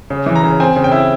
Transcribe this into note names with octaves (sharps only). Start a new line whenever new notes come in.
C#3
E3
A#5
C#3
C4 G#5
C#3
G5
E4